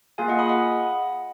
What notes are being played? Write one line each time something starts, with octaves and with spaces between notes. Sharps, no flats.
A#3 F4 G#4 F5 G#5
D#5 F#5
B5 D#6
D#5 F#5